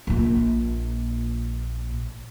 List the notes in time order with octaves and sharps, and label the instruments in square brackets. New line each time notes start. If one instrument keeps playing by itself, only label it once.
[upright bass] A#1 A#2